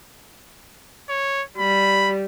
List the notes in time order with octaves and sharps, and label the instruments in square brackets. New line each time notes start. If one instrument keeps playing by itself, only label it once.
[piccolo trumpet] C#5
[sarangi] G3 [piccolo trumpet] B5